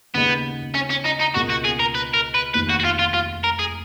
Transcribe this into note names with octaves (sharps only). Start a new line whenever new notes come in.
D#2 C#3 G#3 B3 D#4
C#4
C#4
D#4
D#4
C#2 B2 A#3 F#4
F#4
G#4
A#4
B4
A#4
B4
F1 D#2 D#3 B4
F#4
F#4
F4
F4
F4
A#4
G#4